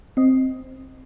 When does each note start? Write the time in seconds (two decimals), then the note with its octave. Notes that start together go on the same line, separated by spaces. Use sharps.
0.17 C4 D#5